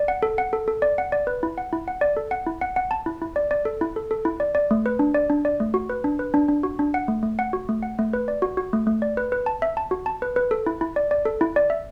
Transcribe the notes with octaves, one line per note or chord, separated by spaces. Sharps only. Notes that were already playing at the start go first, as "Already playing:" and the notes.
Already playing: D5
F#5
A4
F#5
A4
A4
D5
F#5
D5
B4
E4
F#5
E4
F#5
D5
A4
F#5
E4
F#5
F#5
A5
E4
E4
D5
D5
A4
E4
A4
A4
E4
D5
D5
A3
B4
D4
D5
D4
D5
A3
F#4
B4
D4
B4
D4
D4
F#4
D4
F#5
A3
A3
F#5
F#4
A3
F#5
A3
B4
D5
F#4
F#4
A3
A3
D5
B4
B4
A5
E5
A5
F#4
A5
B4
B4
A4
E4
E4
D5
D5
A4
E4
D5
E5